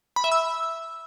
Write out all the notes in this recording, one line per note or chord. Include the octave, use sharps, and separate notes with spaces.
B5
E5
E6